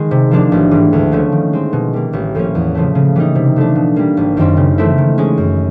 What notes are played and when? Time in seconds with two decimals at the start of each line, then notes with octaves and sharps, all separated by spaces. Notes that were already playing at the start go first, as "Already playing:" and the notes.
Already playing: D#3 G#3
0.11 C3
0.31 F3 A#3 D4
0.52 A1
0.71 G#2 E3 G3 A#3
0.93 D2
1.12 D3 F3 A3 C#4
1.32 D#3
1.53 G#3 C4
1.73 B2
1.93 G3 A#3
2.13 A1
2.35 A2 F3 A#3 C#4
2.55 E2
2.75 C#3 F3 A3
2.95 C#3
3.15 E3 G3 A#3 D#4
3.35 C3
3.56 F3 A3 D4
3.75 B2
3.96 G3 A#3
4.17 G#1
4.37 F#2 D#3 G3 C4
4.57 C#3
4.78 E3 A3 C4 E4
4.98 D#3
5.18 G#3 C#4
5.38 F#2